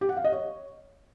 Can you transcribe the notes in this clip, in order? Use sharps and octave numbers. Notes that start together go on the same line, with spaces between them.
G4
F#5
F5
D#5
C#5